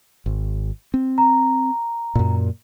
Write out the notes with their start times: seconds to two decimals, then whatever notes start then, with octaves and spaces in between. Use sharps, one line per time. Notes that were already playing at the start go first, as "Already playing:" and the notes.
0.26 G#1
0.94 C4
1.18 A#5
2.15 F#2 A#2